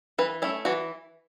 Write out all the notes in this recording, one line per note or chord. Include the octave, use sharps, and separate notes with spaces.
E3 B4
A3 C#4 E4
E3 F#4